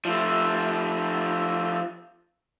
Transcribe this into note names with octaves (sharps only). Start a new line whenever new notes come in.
F3 A3